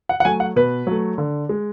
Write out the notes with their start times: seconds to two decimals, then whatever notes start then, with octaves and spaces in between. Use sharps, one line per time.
0.09 F#5
0.20 F#5
0.25 F#3 A3 G#5
0.40 F#5
0.56 B2 B4
0.87 F#3 A3
1.18 D3
1.49 G#3